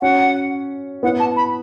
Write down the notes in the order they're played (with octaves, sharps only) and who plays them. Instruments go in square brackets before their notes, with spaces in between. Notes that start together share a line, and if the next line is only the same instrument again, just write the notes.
[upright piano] C#4 F#4 [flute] F#5
[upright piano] B3 E4 [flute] F#5
[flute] A5
B5